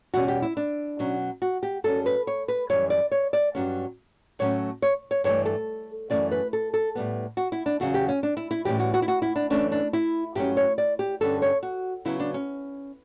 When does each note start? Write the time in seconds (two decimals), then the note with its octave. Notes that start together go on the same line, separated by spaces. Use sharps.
0.14 E2 B2 G3 C#4 F#4
0.28 G4
0.42 E4
0.57 D4
0.99 B2 F#3 C#4
1.42 F#4
1.63 G4
1.84 G2 F#3 C#4 A4
2.06 B4
2.27 C#5
2.48 B4
2.70 F#2 E3 G3 C#5
2.90 D5
3.11 C#5
3.33 D5
3.55 G2 F#3 C#4
4.39 A2 F#3 A3 C#4 C#5
4.82 C#5
5.11 C#5
5.24 G2 E3 A3 C#5
5.45 A4
6.10 F#2 C#3 E3 A3 C#4 D5
6.32 B4
6.53 A4
6.74 A4
6.95 A2 G3 B3
7.37 F#4
7.52 E4
7.66 D4
7.80 E2 C#3 F#3 F#4
7.94 G4
8.08 C#4
8.23 D4
8.37 E4
8.51 E4
8.65 A2 E3 G3 C#4 G4
8.80 F#4
8.94 F#4
9.02 E4
9.08 F#4
9.22 E4
9.36 D4
9.50 F#2 E3 A3 C#4 D4
9.72 D4
9.93 E4
10.35 G2 F#3 A3 C#4 G4
10.57 C#5
10.78 D5
10.99 G4
11.21 G2 D3 G3 C#4 A4
11.42 C#5
11.63 F#4
12.05 C#3 F#3 B3 E4
12.20 D4
12.34 C#4